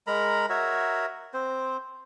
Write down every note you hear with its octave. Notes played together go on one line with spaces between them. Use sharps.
G#3 A#4 A#5 B5
F#4 A#4 C#5 E5
C4 C5